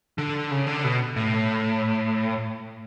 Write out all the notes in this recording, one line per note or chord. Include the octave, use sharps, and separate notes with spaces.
D3
C#3
D3
B2
A2